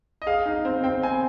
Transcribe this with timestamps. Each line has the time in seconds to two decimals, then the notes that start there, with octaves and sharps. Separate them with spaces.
0.22 D#5
0.26 G#4 F5
0.46 D#4
0.65 C4
0.84 C4 G5
1.02 C4 G#5